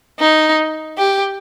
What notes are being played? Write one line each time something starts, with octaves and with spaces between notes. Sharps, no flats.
D#4
G4